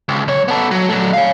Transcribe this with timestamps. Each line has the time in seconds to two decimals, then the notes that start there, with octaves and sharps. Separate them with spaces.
0.09 C#2
0.28 B1 C#5
0.48 B3 A4
0.71 F#3
0.89 F#3 A3
1.13 C#5 F5